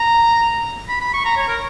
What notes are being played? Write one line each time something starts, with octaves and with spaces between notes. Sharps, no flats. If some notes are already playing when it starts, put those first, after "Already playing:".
Already playing: A#5
B5
B5
C#6
A#5
C#5
A#4